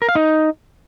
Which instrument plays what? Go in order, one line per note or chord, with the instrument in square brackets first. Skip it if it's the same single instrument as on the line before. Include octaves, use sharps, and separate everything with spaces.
[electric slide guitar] A#4
F5
D#4